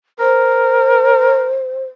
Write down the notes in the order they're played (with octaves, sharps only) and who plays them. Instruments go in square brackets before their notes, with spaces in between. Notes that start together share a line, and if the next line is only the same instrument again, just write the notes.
[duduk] A#4 [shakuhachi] C5